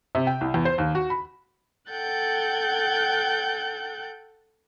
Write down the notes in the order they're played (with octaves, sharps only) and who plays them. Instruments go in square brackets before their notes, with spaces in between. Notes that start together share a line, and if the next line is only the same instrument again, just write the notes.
[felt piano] C3
G5
C2
E2
C5
D#2
F#4
B5
[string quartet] A4 F#5 G5 F#6 G6 A6